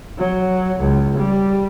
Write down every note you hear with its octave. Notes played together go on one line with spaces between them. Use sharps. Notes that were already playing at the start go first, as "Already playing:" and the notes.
F#3
C#2
G3